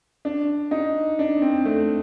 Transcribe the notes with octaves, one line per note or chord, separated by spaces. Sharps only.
D4
D#4
D4
C4
A3